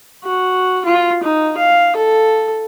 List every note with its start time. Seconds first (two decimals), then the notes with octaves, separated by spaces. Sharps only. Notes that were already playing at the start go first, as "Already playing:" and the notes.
0.24 F#4
0.85 F4
1.23 D#4
1.57 F5
1.96 A4